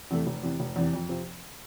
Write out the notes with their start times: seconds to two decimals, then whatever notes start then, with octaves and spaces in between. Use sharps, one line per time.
0.11 E2 C3 E3 A3
0.27 F1
0.43 E2 C3 E3
0.60 F1
0.76 E2 C3 E3
0.93 F2
1.09 C3 F3 C4